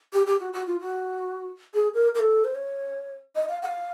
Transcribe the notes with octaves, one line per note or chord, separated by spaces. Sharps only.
G4
G4
F#4
F#4
F4
F#4
G#4
A#4
A#4
A4
C5
C#5
D#5
F5
F#5
F5